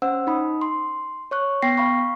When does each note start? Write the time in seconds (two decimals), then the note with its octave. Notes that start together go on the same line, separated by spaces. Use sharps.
0.02 C#4 C5 F#5 E6
0.27 D#4 B5 D#6
0.62 C6
1.31 C#5 C#6 F#6
1.62 B3 G5 A#6 C7
1.78 F5 B5 C#6